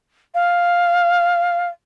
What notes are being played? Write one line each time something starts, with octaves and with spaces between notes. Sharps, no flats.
F5